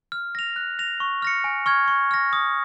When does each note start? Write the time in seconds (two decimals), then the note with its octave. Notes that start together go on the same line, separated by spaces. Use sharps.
0.12 F6
0.35 A#6 F7
0.56 F#6
0.79 A#6 F7
1.00 C#6
1.22 F6 A#6 C#7
1.44 G#5
1.66 C#6 F6 G#6
1.88 C#6
2.11 F6 A#6
2.33 D#6